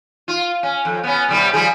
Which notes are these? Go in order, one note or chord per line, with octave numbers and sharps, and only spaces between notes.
F4
C#4
F2
B3 C#4
C3 G3 B3
F3 G3 G#4